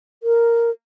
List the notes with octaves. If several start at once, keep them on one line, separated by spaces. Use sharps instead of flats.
A#4